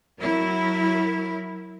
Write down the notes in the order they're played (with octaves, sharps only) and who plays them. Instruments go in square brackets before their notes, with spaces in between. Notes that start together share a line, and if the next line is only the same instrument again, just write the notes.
[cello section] F#3 E4 A#4